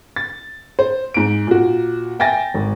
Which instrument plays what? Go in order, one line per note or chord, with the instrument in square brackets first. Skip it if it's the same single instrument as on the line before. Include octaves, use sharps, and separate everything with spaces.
[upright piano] A6
C5
G#2 D7
A#2 F#4
E5 G5 G#5 A6 A#6
G#1